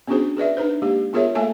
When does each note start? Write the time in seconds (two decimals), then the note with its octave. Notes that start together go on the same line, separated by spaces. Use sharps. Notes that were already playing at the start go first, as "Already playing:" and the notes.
0.07 B3 C#4 D4 F#4 G#4 C5
0.37 G#4 B4 D5 E5
0.57 D4 D#4 B4 C5
0.82 G#3 A#3 G4
1.13 B3 F4 G#4 A#4 C#5 E5
1.35 A3 A#3 A4 E5 G#5 A5